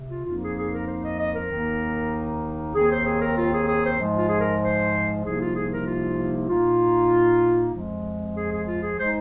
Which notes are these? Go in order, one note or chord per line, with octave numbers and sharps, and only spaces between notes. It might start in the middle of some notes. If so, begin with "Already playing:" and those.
Already playing: C3
F4
F2 F3 A#3 D#4 F4
G#4
G#4
A#4
C5
D#5
D#5
A#4
D#2 D#3 A#3 D#4
D#2 D#3 C4 G#4
C5
G#4
A#4
F4
G#4
G#4
C5
G#2 F3 G#3
F4
G#4
A#4
C5
C2 C3 F3 A#3 D#4 G#4
F4
G#4
A#4
F4
A#2 A#3 D#4 F4
F2 F3 G#3
G#4
G#4
F4
G#4
G#3 D#4 C5